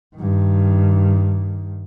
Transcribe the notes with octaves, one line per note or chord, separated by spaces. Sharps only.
G2 D#3